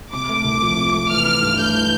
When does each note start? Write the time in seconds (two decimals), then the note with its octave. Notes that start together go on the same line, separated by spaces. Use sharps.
0.12 C3 D6
0.29 A3
0.44 C2
0.62 F3
0.77 C3
0.94 A3
1.10 E3 F6
1.26 E4
1.42 G2
1.59 A3 G6
1.75 E3